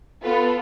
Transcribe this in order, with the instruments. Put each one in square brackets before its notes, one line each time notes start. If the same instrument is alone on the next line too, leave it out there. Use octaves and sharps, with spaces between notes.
[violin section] B3 F4 A4 B4